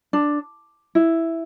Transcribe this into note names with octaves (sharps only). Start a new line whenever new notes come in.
D4
E4